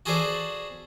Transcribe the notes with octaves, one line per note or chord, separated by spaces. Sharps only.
F#4 G#4 A4 B4 C5 D5